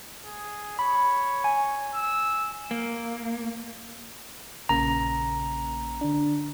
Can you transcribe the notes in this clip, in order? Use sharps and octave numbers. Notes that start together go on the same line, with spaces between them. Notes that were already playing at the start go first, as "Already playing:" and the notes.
G#4
C#5 B5
G#5
E6
A#3
A#1 C#3 A#3 A#5
D3 D4